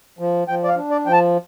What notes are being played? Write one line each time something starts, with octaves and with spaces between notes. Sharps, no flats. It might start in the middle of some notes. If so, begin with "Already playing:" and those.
F3
F3 G5
D5
F5
D4
D5
F3 G5
A5